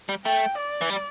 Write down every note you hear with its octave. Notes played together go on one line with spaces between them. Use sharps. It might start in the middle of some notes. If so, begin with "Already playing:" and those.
G3
A3 G5
D5
E3
G3